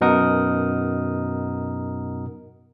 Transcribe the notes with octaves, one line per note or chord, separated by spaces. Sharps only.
F#2 B2 D#4 A#4 F#5 D#6